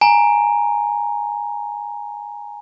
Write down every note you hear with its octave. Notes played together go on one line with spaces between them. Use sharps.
G#5 A#5